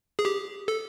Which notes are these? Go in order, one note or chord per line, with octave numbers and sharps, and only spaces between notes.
G#4
G4
A4